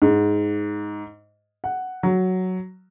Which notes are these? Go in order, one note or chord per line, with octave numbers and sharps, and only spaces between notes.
G#2
F#5
F#3